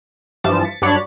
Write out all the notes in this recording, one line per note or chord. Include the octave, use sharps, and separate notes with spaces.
G2 E3 F3 A5
A6 B6 C#7
G2 F#3 D4 C#5 B5 A6